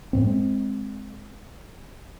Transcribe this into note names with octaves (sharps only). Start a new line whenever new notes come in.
F#2 A2 C4
G#3 C4